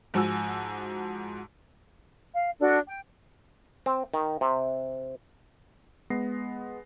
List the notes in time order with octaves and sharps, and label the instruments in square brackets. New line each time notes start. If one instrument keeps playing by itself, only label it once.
[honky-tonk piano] G#2 F3 F#4 G#5 E6
[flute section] F5
D4 F#4 A4
G5
[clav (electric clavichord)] C4
D#3
C3
[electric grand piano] G#3 B3 A#6 C7